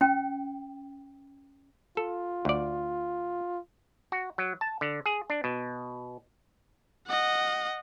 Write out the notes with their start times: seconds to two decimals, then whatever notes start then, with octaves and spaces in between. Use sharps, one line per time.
0.01 C#4 G5
1.97 F4 A4
2.45 D2 D5
4.12 F#4
4.38 F#3
4.61 A5
4.81 D3
5.06 G#4
5.30 D4
5.44 B2
7.07 D#5 F#5